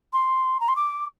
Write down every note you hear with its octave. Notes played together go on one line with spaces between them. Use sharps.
C6
A#5
C6
D6